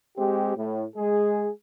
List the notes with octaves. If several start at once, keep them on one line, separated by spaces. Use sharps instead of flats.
G#3 C4 G4
A2
G#3 G#4